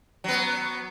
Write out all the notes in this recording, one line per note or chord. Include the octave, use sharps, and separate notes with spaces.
F#3 B3